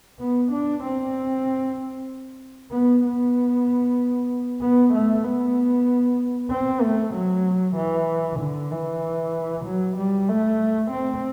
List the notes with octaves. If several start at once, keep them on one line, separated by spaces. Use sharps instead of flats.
B3
D4
C4
B3
B3
B3
A3
B3
C4
A3
F#3
E3
D3
E3
F#3
G3
A3
C4